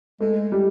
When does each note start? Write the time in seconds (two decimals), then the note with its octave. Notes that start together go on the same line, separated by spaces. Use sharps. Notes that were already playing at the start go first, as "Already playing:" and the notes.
0.20 G#3 A3
0.52 G3